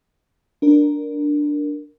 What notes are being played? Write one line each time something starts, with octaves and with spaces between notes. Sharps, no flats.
D4 A#4